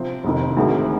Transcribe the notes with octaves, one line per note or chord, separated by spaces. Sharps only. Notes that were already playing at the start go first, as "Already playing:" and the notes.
Already playing: C3 F3 C4
F1 F2 D#3
D2 C3 D#3 G#3